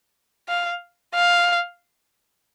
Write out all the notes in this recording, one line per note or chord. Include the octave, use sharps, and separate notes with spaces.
F5
F5